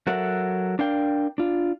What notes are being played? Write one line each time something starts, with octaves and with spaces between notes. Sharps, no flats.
F#3 F#4 A4 A#4 E5 F#5
D4 A#4 F5 G5
D4 F4